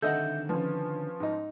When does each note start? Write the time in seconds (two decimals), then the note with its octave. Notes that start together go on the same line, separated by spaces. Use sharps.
0.02 D3 D#3 C4 A4 D#5 E5 F#5 G6
0.49 F3 C#4 B4
1.20 G#2 D#4